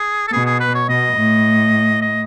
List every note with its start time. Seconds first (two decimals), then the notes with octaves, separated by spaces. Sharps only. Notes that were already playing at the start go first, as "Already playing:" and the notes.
Already playing: G#4
0.27 A4
0.32 B2 G#4
0.45 G#4
0.60 B4
0.74 C#5
0.89 B2 D#5
1.17 A2
2.01 D#5